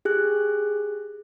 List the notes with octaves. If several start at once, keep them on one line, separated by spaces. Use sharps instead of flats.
G4 G#4 F#6